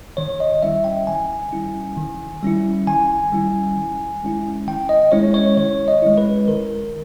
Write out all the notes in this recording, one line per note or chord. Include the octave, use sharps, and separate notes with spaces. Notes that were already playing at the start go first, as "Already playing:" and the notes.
D#3 C#5
D#5
G3 C#4 E4 E5
G5
D#3 G#5
G3 C#4 E4
D#3
G3 C#4 E4
D#3 G#5
G3 C#4 E4
D#3
G#3 C#4 E4
D#3 G5
D#5
G#3 C#4 E4 C#5
C#5
D#3 C#5
D#5
G#3 C#4 E4
B4
D#3 A#4